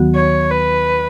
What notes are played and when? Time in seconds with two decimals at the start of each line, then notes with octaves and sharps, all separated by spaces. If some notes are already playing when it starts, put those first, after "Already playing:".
Already playing: D#2 D#3 F#3 B3 F#4
0.15 C#5
0.51 B4